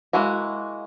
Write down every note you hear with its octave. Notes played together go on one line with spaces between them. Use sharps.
G#3 A#3 E4 F#4